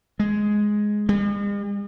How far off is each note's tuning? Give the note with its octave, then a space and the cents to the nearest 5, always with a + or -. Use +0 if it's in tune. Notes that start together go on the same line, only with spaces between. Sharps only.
G#3 +5
G#3 -45